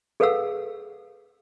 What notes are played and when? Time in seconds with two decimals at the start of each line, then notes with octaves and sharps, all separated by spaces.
0.20 G#4 A4 B4 F5 F#5 E6